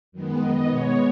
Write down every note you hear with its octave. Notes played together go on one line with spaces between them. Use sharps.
F#2 D#3 G#3 B3
F#2 D#3 B3 D#5
B2 G#3 B3 C#5